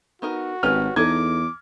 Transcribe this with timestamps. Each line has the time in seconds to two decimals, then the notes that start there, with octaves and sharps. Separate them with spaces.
0.22 B3 D#4 F#4 A#4
0.63 G#1 C#4 G4 B4 F6
0.96 E2 D#4 A4 D6 G#6